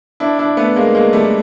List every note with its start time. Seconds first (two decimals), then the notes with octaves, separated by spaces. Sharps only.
0.20 D4 E4
0.39 D4 E4
0.57 A3 B3
0.76 G#3 A#3
0.95 G#3 A#3
1.13 G3 A3